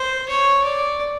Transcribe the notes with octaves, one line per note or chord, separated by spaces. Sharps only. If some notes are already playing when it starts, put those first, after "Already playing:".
Already playing: C5
C#5
D5